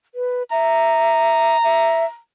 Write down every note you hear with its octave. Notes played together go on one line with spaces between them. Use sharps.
B4
E5 A#5
E5